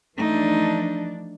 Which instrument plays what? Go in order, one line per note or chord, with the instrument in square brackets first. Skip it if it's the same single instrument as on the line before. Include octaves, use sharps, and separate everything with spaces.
[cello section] E3 F3 D4 [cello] A3 D#4